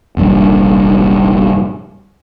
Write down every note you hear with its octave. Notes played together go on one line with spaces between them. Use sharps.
F1 A#1 G2